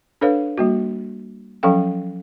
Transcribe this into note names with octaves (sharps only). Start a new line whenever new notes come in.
D4 A4 B4 C#5 F5
G3 A#3 F#4
F3 F#3 C#4 A4 F5 G5